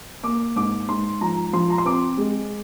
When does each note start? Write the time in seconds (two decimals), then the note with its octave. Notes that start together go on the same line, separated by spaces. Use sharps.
0.23 A#3 D6
0.56 G#2 D6
0.88 G#2 C6
1.21 F3 A#5
1.53 F3 C6
1.70 A#5
1.78 C6
1.85 C4 D6
2.17 G#3